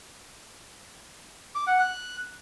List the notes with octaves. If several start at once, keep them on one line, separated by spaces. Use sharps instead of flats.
D6
F#5
F#6